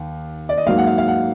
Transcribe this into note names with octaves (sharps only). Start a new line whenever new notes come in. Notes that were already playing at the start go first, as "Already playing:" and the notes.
Already playing: D#2
D5
D#5
G#2 F#3 A#3 F5
F#5
F5
F5
F#5